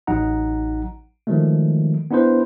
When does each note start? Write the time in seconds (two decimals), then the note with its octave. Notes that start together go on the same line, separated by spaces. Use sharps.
0.07 A1 F#3 D#4 F#5 A#5
1.27 D#3 F3 F#3 G#3 A3
2.11 B3 D4 E4 B4 C5